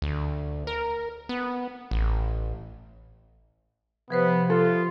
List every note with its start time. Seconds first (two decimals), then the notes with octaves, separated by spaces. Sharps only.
0.02 D2
0.67 A#4
1.29 B3
1.91 A1
4.10 C3 F3 B3 B4 C5
4.50 F4 A4